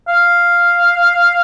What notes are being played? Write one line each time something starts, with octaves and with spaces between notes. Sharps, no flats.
F5